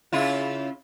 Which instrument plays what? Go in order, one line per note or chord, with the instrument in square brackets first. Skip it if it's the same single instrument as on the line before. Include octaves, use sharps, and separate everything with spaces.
[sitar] C#3 E4 F4